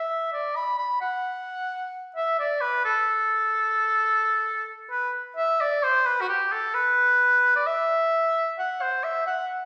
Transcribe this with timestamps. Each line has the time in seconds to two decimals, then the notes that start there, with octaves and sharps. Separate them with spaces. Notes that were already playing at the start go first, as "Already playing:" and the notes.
Already playing: E5
0.33 D5
0.56 B5
0.79 B5
1.01 F#5
2.16 E5
2.39 D5
2.61 B4
2.85 A4
4.91 B4
5.37 E5
5.61 D5
5.84 C5
6.06 B4
6.21 F#4
6.29 G4
6.53 A4
6.74 B4
7.56 D5
7.67 E5
8.59 F#5
8.82 C5
9.04 E5
9.27 F#5